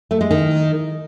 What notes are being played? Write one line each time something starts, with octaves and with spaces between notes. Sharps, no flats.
A3
G#3
D#3